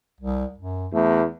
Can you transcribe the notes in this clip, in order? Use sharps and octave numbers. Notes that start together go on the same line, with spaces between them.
C2
F#2
E2 A3